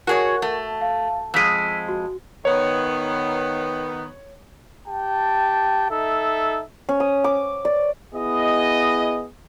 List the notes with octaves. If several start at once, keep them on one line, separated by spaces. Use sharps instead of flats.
F#4 G#4 A#4 C#5
A3
F5
F2 G#3 E6 B6 D#7
F#4
D#3 B3 C#5
G4 G5 A5
D#4 A4 E5
C#4
D#6
D6
D5
B3 E4 G#4 D#5